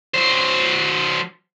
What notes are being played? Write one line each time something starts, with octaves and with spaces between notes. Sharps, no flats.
F#3 C5